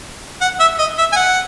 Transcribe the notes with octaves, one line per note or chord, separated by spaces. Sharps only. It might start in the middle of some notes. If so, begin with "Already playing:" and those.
F#5
E5
D#5
E5
G#5
F#5